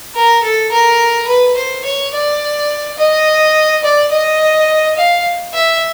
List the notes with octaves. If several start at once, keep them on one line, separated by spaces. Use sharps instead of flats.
A#4
A4
A#4
B4
C5
C#5
D5
D#5
D5
D#5
F5
E5